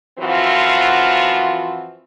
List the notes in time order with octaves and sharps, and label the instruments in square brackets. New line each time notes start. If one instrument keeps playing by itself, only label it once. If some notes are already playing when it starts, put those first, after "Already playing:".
[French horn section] F#2 E3 F3 C4 F4 F#4